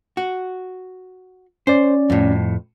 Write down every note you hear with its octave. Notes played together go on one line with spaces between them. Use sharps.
F#4
C#4 C5 D5
F2 A2